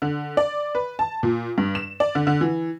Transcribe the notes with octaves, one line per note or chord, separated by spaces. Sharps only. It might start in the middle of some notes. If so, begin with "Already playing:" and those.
D3
D5
B4
A5
A#2
G2
E7
D5
D3
D3
E3